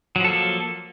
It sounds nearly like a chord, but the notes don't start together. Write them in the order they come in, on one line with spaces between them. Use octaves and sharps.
F#3 F3 A4 A#3